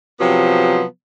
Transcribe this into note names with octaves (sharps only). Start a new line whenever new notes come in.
C3 F3 F#3 B3